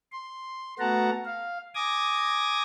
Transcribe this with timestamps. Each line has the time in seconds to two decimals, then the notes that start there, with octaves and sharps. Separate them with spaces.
0.12 C6
0.79 A3 B3 F#4 F#5 A5 A#5
1.25 F5
1.75 G#5 D6 D#6 G#6 A#6